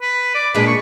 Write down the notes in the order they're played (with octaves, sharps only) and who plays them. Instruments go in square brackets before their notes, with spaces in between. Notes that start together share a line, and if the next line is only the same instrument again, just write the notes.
[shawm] B4
D5
[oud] A#2 G#3 D4 [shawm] B4
[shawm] C#6